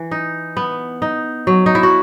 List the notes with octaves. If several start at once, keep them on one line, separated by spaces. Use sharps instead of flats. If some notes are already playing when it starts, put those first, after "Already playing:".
Already playing: E3
D#4
B3
D#4
F#3
D#4
E4
F#4